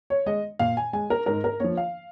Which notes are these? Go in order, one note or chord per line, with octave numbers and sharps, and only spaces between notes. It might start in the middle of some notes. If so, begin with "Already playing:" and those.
C#5
G#3 D#5
A#2 F5
G#5
G#3 G#5
A#4
G#2 A#4
A#4
F3 A#3 C#5
F5